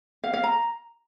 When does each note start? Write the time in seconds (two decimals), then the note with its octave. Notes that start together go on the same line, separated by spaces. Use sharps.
0.24 F5
0.34 F5
0.44 A#5